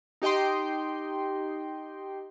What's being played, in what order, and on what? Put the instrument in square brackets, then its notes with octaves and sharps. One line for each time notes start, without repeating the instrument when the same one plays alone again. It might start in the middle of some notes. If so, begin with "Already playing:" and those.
[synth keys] D#4 G4 D#5 G5 C6